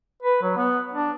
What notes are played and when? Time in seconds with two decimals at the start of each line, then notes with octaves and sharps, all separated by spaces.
0.22 B4
0.42 F#3
0.57 B3
0.94 D4